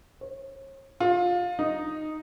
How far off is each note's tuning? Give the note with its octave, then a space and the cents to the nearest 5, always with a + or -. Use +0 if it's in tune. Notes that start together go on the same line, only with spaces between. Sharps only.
C#5 -40
F4 +20
D#4 -5